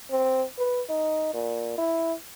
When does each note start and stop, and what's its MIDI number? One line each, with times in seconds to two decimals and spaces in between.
0.11 0.43 60
0.59 0.82 71
0.89 1.33 63
1.34 1.75 46
1.78 2.13 64